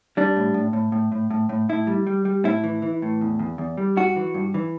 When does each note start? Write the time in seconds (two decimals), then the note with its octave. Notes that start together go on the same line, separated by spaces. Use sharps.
0.17 G3 D4
0.36 A2
0.54 A2
0.73 A2
0.92 A2
1.12 A2
1.31 A2
1.49 A2
1.69 A2 E4
1.87 G3
2.07 G3
2.25 G3
2.44 A2 E4
2.64 E3
2.82 E3
3.02 A2
3.21 E2
3.39 E2
3.58 E2
3.77 G3
3.97 G2 F#4
4.16 E3
4.34 G2
4.54 E3